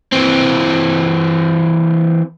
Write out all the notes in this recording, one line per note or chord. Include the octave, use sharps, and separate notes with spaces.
E3 C4